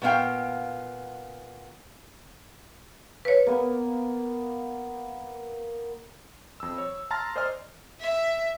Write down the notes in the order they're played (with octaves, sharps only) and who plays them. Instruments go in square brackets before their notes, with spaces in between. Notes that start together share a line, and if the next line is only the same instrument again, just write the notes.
[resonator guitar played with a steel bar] A#2 B3 D4 F5 G5
[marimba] B4 C#5
[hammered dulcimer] A#3 B3
[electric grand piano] F2 E6
C#5
A5 A#5 C6 F6 A6
C5 D5 D#5 G#5 C6 F6
[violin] E5